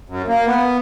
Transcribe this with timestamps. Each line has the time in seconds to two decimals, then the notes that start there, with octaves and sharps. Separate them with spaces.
0.10 F#2
0.28 A#3
0.46 B3